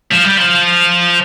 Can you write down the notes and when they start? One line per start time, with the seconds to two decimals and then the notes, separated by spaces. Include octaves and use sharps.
0.11 F3
0.24 G3
0.37 F3